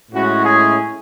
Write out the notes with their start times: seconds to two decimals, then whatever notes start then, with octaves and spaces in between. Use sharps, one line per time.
0.12 A2 G#3 C#4 E4 F#4
0.44 G#4